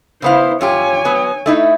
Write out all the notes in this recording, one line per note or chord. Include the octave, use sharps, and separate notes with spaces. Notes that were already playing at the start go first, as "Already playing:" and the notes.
C#3 B3 E4 C5 F5
F#2 F4 G4 C#5 G#5
F#3 B3
A3 D#4 E4